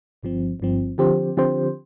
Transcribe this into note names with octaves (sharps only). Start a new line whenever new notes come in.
G1 G2 F3 C4
G1 G2 F3 C4
D3 F3 C4 G4 C5
D3 F3 C4 G4 C5